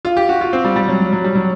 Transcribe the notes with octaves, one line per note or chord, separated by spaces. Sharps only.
F4
G4
F#4
F4
C4
G3
G3
F#3
F#3
F#3
G3
F#3